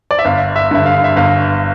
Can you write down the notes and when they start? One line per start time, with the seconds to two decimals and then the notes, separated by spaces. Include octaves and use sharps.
0.11 D5
0.19 E5
0.25 G1 F5
0.56 E5
0.71 G2 D3 E5
0.86 F5
1.04 E5
1.16 G1 F5